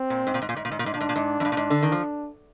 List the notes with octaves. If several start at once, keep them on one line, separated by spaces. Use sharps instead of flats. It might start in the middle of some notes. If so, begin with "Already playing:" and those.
Already playing: C4
A#2
G#2
A#2
G#2
A#2
G#2
A#2
G#2
A#2
G#2
A#2 D4
G#2
A#2
G#2
F2
G2
A#2
G#2
D3
D#3
F3